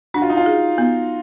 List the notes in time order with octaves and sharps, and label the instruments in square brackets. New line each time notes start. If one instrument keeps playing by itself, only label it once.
[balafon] D4 [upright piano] F#4
[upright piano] F4
D#4
F4
[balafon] G#4
B3